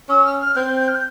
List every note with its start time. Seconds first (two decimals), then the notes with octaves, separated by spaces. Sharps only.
0.09 C#4 E6
0.24 F6
0.40 F6
0.56 C4 G6
0.80 G6
0.87 F6
0.94 G6